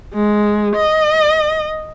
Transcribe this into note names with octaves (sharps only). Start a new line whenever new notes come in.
G#3
D#5